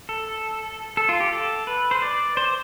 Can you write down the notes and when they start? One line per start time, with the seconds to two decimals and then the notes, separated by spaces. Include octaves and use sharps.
0.09 A4
0.97 A4
1.09 F4
1.20 G4
1.33 A4
1.67 B4
1.91 C5
2.02 D5
2.37 C5